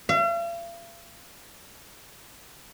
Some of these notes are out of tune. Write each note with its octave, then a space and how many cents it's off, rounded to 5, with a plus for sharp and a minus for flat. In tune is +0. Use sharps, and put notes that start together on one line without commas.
F5 -45